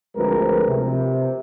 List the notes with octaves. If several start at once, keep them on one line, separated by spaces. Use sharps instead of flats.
D2 F3 G#3 C4 A#4 B4
C3